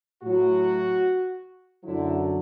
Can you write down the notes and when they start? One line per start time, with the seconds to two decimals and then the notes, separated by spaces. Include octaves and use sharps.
0.23 A2 F#3 F#4
1.84 F#2 D3 F#3 E4